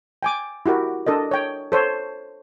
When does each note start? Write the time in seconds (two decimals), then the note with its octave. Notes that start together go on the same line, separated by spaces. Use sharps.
0.23 G5 G#5 D6
0.66 E4 F#4 G4 A#4
1.06 D4 A4 A#4 D#5
1.31 C#5 G5
1.72 A4 C5 C#5